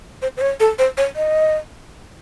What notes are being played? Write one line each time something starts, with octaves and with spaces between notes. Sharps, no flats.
C5
C5
C#5
A4
C5
C#5
D#5